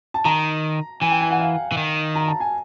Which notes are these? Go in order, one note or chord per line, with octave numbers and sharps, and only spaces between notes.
A5
D#3 A#5
E3 G#5
G5
G#5
F#5
F5
E3
D#3
A#5
A5
G#5